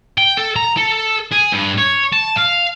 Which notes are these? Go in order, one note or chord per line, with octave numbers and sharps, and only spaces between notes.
G5
A4
A#5
A4
G#4
G2
C#5
A5
F5